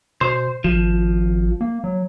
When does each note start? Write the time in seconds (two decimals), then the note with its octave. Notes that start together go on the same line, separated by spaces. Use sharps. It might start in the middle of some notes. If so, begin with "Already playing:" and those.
0.21 B2 C5
0.64 G#1 F3
1.61 A#3
1.84 F#3